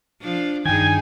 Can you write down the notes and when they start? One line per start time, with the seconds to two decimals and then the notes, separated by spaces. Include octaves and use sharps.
0.21 F3 D4
0.65 G2 D#3 D4 D#4 G#4 G5 G#5 G#6